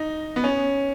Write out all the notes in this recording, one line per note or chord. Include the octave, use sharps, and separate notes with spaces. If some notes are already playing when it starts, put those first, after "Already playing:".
Already playing: D#4
B3
C#4